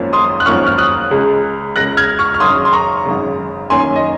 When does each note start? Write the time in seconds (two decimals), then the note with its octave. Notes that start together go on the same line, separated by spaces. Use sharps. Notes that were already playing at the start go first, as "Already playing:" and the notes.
Already playing: G#1 F#2 F3 A#3 C#4
0.13 C6 D#6
0.40 F#6
0.45 G#1 F#2 F3 A#3 C#4 C#6 F6
0.67 F6
0.78 D#6 F#6
1.11 C#2 C#3 G#3
1.76 C#2 C#3 G#3 F#6 A#6
1.97 F6 G#6
2.19 C#6 F6
2.34 F6
2.40 G#1 F#2 C#3 C6 D#6
2.65 C6
2.72 A#5 C#6
3.05 G#1 F#2 C#3
3.70 F#2 D#3 A#3 C#4 G#5 C6
3.96 D#5